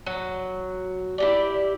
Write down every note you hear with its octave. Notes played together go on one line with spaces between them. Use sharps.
F#3
E4 G4 D5